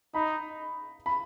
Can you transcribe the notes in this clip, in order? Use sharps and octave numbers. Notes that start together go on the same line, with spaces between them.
D#4 B5
B5